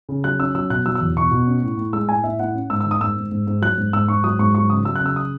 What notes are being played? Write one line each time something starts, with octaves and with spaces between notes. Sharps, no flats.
C#3
F#3 F#6
C#4 E6
F#3 E6
B2 F#6
F#3 E6
E6
E2
B2 C#6
B2
C#4
A2
A2
G#3 E6
A2 G#5
A2 E5
A2 F#5
C#4
G#2 E6
D#3 E6
D#6
G#2 E6
G#2
G#2
G#2
F#3 F#6
G#2
G#2 E6
G#2 C#6
F#3 D#6
G#2 C#6
F#3 C#6
C#3 D#6
F#3 E6
F#6
C#3 E6
D#6